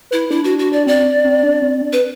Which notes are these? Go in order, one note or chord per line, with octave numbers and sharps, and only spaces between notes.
E4 B4
D4 E4
F#4
F#4
D5
C4 D5
C4
D4
C4
D4
B4